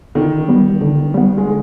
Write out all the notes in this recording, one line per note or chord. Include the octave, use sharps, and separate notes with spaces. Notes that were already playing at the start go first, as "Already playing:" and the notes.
D3 D#3
G3 B3
D3
G3 B3
G#3
D3